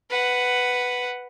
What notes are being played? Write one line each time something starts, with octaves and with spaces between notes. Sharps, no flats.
B4 F#5